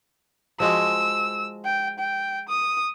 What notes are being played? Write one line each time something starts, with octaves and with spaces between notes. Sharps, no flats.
F3 G#3 F#4 E6
G5
G5
D#6